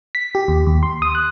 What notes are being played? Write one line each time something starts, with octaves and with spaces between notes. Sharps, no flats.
B6
G4
D#2
D#2
C6
D#6
F#6